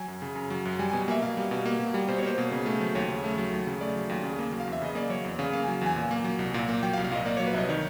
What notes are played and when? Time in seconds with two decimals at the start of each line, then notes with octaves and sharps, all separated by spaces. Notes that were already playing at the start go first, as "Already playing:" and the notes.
Already playing: F#3 G#5
0.08 F#2
0.22 C#3
0.36 F#2
0.50 F#3
0.65 F#2
0.79 G3 G#5
0.90 B2 G#5
1.08 A#3 E5
1.22 B2 F5
1.37 G3
1.51 B2
1.66 A#3
1.79 B2
1.94 G3
2.08 B2 C5
2.18 C#5
2.23 A#3 C5
2.38 B2
2.52 C#3
2.66 A3
2.80 F#3
2.95 D#2 C#5
3.09 C#3
3.24 A3
3.38 F#3
3.53 D#2
3.67 C#3
3.81 A3 D5
3.96 F#3
4.09 D#2
4.23 C#3
4.39 A#3
4.52 F#3
4.60 F5
4.67 E2 E5
4.82 C#3 D#5
4.95 A#3 D5
5.10 F#3 C#5
5.25 E2
5.39 C#3 F5
5.53 A#3 F5
5.64 F#3 G#5
5.81 E2 G#5
5.96 A#2
6.11 A#3
6.24 F#3
6.39 C2
6.54 A#2
6.69 A#3
6.83 F#3 G5
6.93 F5
6.97 C2
7.04 F5
7.12 A#2 D#5
7.25 A#3 D5
7.37 F#3 C#5
7.46 B4
7.53 C2 D#5 E5
7.69 D#3 C#5